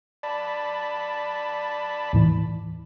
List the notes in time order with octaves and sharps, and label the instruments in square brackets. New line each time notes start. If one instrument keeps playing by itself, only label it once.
[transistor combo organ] D5 A5 B5
[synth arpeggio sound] D#2 A2 E3